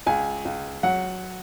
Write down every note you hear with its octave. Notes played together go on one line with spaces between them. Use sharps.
C#2 G#5
C#2
F#3 F#5